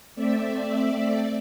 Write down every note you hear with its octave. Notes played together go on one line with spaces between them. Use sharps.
A3 C4 D5 E5